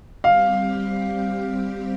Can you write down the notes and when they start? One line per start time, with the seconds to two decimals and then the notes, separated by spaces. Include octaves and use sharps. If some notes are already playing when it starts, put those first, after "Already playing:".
0.24 G3 C4 G4 F5